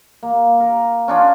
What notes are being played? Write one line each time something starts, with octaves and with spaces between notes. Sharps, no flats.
A#3
A#4
C#4 D4 F4